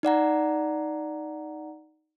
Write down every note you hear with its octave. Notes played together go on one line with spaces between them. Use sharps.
D#4 D5 F#5 A#5